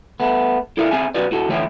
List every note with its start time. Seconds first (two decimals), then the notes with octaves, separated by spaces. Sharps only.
0.20 A3 B3
0.77 E4 A4 A#4 D5 E5 F5
0.91 C4 G#4 E5 G#5
1.14 B1 F#4 B4 D5
1.31 A2 F#4 A4
1.48 D2 E3 A3 C#5 E5 G5